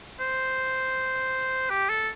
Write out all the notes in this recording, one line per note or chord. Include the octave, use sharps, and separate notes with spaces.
C5
G4
A4